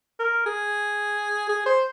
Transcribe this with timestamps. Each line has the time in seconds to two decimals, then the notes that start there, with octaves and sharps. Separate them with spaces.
0.20 A#4
0.46 G#4
1.49 G#4
1.66 C5